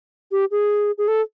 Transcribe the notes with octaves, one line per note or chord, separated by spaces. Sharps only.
G4
G#4
G#4
A4